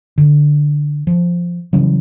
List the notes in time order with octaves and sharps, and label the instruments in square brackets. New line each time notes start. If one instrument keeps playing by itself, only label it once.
[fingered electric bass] D3
F3
C#3 E3 F#3 G3